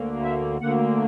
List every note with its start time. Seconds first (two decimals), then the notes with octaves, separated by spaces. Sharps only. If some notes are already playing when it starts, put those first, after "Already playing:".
Already playing: D2 D3 A#3
0.22 E5
0.61 D2 D3 A#3 F#5